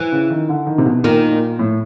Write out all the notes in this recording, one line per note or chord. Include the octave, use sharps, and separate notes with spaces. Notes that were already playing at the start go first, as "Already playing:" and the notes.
Already playing: E3
C#3
D#3
D3
D#3
C3
B2
A#2 D#3
A#2
A2